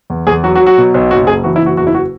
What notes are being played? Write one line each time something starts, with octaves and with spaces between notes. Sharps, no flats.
E2
E2 G#4
F#3 F#4
F#4
F#3
F#4
B2
B1
F#1 F#4
F#1 G#4
E3 F#4
E4
F#1 F#4
E2 F#4
E4
F#4